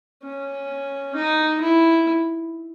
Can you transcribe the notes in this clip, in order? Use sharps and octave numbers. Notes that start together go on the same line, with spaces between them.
C#4
D#4
E4